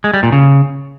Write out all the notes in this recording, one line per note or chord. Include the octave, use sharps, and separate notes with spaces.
G#3
G3
A#2
C#3